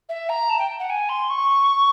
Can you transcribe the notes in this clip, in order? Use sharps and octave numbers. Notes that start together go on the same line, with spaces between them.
E5
A#5
A5
G5
F#5
G#5
C6
C#6